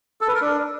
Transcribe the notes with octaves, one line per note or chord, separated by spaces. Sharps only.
A4
B4
A#4
D4